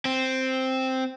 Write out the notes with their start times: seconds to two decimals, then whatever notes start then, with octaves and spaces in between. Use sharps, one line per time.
0.05 C4